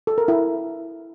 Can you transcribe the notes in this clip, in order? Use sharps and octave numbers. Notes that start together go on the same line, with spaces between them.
A4
A#4
E4